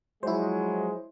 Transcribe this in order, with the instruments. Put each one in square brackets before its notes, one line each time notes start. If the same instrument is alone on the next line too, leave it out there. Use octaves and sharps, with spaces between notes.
[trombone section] F3 F#3 G#3 [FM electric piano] E4 C5